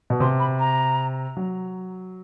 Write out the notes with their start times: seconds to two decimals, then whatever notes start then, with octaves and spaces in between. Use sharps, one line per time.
0.10 B2
0.20 C3 C6
0.40 B5
0.59 A#5
1.37 F#3